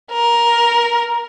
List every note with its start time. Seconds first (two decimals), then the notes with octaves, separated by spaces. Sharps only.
0.12 A#4